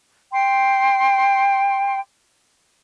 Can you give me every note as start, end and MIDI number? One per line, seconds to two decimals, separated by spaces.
0.31 1.98 79
0.31 1.98 84